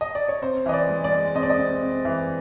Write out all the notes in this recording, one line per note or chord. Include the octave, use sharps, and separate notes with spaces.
D#5
D5
C#5
C4 C5
E3 D#5
D5
G#3
D5
G#3
C4 D#5
D5
D#5
C4
C4
E3